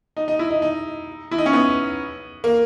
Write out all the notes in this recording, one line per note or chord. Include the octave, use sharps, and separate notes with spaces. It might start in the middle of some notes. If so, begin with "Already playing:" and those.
D#4
D#4
E4
D#4
D#4
E4
D#4
C#4
B3
A#3